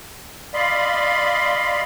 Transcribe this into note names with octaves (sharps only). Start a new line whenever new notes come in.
D5 D#5 F5 B5 C6